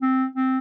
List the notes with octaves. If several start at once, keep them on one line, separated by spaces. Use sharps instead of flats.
C4
C4